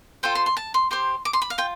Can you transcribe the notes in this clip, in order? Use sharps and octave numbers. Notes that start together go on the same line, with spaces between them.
F4 A4 C5 G5
C6
C6
A5
C6
G4 C5 C6
D6
C6
B5
F5
F4 G5